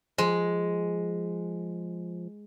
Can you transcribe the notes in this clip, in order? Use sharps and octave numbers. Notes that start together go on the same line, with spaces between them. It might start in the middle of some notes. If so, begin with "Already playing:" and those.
F3 G#3